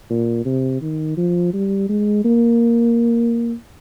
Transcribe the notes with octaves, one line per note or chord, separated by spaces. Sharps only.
A#2
C3
D#3
F3
G3
G#3
A#3